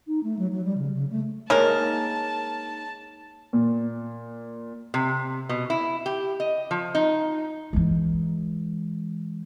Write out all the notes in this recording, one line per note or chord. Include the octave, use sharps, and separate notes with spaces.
D#4
A3
F#3
F#3
G3
C#3
C#3
A3
G#3 A#3 D#4 A#4 C#5 A5
A#2
C3
B2
E4
G4
D#5
F3
D#4
E3 G#3